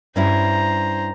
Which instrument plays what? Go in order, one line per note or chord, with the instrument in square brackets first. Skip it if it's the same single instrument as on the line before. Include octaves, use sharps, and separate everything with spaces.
[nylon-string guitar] G2 C#4 E4 [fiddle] C5 A#5